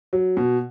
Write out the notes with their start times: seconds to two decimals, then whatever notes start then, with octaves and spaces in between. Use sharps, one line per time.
0.13 F#3
0.37 B2